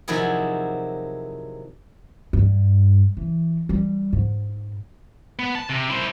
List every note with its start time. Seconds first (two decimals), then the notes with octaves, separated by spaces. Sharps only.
0.08 C3 D#3 F3 F#3 E4 G#4
2.33 G2
3.17 E3
3.69 G3
4.13 G#2
5.39 B3
5.55 A5
5.70 C3
5.90 E4 C5